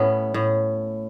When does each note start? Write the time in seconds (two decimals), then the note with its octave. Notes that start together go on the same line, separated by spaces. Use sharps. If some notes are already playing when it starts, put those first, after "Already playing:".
Already playing: A2 B3 C#4
0.34 A2